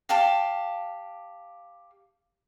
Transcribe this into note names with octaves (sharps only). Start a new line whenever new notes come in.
G4 F5 A5 D6